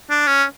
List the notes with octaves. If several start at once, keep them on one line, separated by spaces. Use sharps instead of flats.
D4
C#4